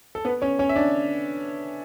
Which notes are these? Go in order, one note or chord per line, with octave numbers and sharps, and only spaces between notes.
A4
B3 B4
C#4 C#5
C#4 C#5
E5
D4 D5